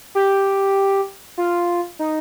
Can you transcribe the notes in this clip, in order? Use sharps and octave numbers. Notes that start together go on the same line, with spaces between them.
G4
F4
D#4